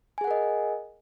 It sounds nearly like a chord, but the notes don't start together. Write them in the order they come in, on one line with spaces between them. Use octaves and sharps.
G#5 G#4 F#5 A#4 D#5